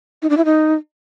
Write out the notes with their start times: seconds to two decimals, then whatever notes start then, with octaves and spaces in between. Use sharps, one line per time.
0.22 D#4
0.30 D4
0.37 E4
0.45 D#4